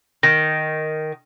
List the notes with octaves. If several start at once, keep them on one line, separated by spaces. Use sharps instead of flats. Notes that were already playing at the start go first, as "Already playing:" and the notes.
D#3 A#6